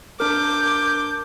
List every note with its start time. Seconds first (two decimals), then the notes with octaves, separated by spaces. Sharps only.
0.20 D4 A#4 D6 G6